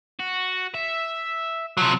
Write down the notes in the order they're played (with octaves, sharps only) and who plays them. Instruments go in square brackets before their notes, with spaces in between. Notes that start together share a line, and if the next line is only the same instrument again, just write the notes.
[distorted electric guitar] F#4
E5
[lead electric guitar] C3 F#3 [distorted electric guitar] F3